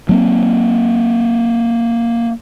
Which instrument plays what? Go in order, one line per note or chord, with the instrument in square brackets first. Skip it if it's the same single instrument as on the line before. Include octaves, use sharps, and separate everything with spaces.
[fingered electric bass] F#3 A#3 C4